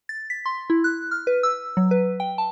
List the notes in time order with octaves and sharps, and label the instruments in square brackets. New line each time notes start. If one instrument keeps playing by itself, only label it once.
[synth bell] A6
B6
C6
E4
F#6
F6
B4
E6
F#3
B4
G5
A5